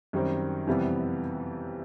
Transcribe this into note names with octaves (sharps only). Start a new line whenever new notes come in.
F#2 D#3 G3 C4
F2 C3 E3 G3 B3